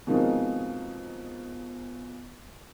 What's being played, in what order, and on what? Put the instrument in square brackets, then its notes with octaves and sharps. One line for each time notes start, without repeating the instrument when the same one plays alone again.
[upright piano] B2 D#3 F3 G#3 A#3 C4